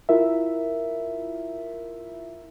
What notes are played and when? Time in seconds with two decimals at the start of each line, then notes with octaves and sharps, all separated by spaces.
0.09 E4 F4 A#4 E5